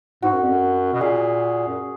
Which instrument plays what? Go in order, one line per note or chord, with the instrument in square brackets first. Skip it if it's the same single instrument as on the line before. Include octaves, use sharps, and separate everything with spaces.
[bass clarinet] G#2 [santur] F#4
[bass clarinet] F#2
F2
F#2
B2
[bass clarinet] A#2 [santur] G#4
[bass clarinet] F#2